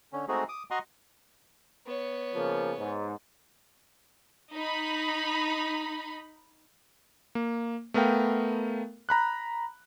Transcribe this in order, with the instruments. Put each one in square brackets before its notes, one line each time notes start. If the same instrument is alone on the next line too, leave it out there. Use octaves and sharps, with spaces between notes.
[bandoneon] D3 C#4
G#3 A3 C4 D#4 F#4 G#4
D6 D#6
F#4 D#5 F#5 A#5 C6 C#6
[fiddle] B3 C#5
[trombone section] C#3 F3 A#3
G#2
[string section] D#4 B5
[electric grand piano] A#3
A3 B3 A#4 F5 G5
A#5 B5 F#6